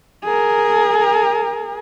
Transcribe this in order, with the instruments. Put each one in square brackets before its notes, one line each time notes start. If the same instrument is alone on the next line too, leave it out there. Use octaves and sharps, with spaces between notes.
[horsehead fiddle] G#4 A#4